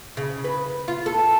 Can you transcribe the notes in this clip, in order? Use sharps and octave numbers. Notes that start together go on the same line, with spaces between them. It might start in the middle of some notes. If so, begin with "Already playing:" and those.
C#3
B4
F4
A4